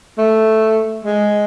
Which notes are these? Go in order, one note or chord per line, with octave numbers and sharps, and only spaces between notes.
A3
G#3